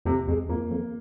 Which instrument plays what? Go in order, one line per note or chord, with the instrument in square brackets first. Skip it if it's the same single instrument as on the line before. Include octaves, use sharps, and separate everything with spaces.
[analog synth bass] F2 [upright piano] C3
[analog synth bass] F2 [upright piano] G#3
[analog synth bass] F2 [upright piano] A#3
[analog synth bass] F2